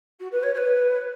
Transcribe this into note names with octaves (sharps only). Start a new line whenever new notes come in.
F#4
B4
C#5
C#5
B4